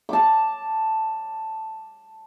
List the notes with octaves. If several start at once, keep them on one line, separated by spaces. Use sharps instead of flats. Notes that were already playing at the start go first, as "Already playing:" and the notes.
A5 D6